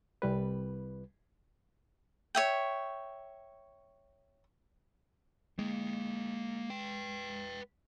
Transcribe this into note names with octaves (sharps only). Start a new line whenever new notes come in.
C2 G3 B4
C#5 E5 G5
G#3 A#3 G5
B4 G5